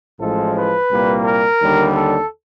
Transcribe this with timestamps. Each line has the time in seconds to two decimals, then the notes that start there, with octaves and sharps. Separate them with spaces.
0.19 A1 A2 F3 G#3 A4
0.54 B4
0.90 C2 A#2 G3 A#3
1.25 A#4
1.60 D#2 D3 G3
1.95 A4